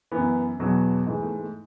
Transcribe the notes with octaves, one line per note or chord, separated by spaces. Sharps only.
F#2 E3 B3
E2 B2 F#3
G#2 E3 A3
A3
A3